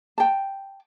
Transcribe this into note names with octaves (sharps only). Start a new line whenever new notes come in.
G5 A5